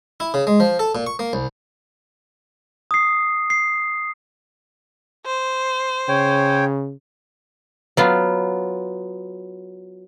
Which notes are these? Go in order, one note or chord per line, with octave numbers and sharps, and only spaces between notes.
E4
C#3
G#3
F3
A4
A#2
C#6
A#3
C2
D#6 C7
C7
C5
C#3 C#5 G5
F#3 B3 F4